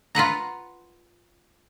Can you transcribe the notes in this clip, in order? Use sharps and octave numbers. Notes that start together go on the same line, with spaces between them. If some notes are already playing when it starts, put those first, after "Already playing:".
F4 B4 F#5 A#5